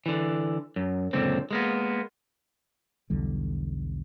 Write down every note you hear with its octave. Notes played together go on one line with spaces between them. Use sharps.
D3 E3
F#2
C#2 F#2 A#2 D3 C4
G#3 A#3 B3
B1 E2 D3 G3